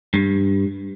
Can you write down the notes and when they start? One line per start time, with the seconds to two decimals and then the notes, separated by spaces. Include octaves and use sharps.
0.14 G2